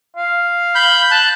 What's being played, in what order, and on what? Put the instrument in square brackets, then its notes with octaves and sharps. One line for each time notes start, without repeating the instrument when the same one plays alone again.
[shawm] F5
[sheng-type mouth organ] B5 G6
A5 F#6